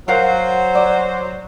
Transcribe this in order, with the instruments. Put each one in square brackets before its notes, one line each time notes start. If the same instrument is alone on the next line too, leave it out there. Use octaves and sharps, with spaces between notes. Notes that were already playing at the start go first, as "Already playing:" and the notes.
[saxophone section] F#3 C5 [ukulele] A#4 F5 F#5
[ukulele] D5